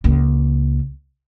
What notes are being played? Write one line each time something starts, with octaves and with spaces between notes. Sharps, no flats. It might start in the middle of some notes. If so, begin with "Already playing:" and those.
C#2 A#3